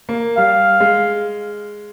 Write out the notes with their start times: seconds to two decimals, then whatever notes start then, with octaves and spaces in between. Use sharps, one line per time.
0.09 A#3
0.37 G3 F5
0.80 G#3